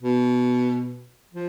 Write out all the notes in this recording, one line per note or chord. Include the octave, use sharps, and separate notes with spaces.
B2
F3